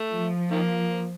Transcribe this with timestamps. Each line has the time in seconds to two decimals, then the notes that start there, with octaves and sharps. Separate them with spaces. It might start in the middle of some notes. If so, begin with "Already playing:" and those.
Already playing: A3
0.13 F3
0.51 D#3 A#3